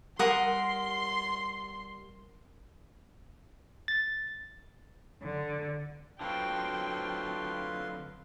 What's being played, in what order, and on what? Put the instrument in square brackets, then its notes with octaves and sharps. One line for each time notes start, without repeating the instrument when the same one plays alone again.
[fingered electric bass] G3 [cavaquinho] A#4 F#5 D#6 [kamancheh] C6
[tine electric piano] A6
[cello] D3
[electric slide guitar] D3 F#3 C4 [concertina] F4 B4 C6 [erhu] G5 [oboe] A5